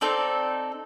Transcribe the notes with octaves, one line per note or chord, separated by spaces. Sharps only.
C4 D#4 A4 D5